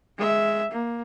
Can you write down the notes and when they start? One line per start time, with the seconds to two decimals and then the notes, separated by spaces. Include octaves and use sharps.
0.18 G#3 E5
0.71 A#3